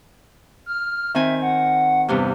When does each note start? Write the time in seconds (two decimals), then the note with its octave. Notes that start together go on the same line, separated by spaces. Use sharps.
0.66 F6
1.15 D#3 C4 E5 G#5
1.42 F#5
2.08 E2 G2 C3